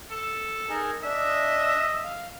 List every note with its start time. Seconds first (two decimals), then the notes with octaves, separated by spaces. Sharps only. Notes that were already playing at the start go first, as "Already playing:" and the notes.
0.11 A4
0.69 D#4 G#4 A#4
1.03 D4 D#5 E5
2.04 F5